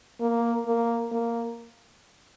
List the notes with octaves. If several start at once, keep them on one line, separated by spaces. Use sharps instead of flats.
A#3
A#3
A#3